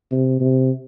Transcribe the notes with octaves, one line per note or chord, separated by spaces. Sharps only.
C3
C3